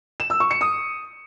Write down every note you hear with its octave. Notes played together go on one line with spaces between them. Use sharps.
E7
E6
C#6
C#7
D#6